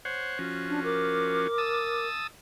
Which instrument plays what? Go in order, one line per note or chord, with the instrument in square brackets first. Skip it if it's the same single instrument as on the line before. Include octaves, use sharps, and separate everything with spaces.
[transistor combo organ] C5 C#5 F#5
F3 C#4 F#4
[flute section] D4
A#4 D6
[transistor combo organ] A5 D#6 E6